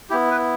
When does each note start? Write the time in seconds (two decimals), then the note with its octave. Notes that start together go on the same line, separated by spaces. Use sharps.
0.10 B3 E4 G4
0.31 B4